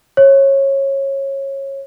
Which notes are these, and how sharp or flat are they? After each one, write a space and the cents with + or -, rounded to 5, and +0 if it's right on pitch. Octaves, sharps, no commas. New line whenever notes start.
C#5 -20